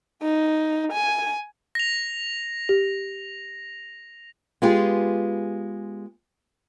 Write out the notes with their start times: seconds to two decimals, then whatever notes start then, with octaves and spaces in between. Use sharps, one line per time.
0.23 D#4
0.93 G#5
1.75 A#6 F7
2.69 G4
4.62 G#3 B3 F4 G4 G#4